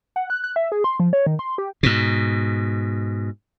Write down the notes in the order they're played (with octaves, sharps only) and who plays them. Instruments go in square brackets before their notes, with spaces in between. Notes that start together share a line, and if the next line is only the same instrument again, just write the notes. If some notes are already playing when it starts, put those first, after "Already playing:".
[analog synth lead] F#5
F#6
F#6
E5
G#4
C6
F3
C#5
D#3
C6
G4
[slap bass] G#2 B2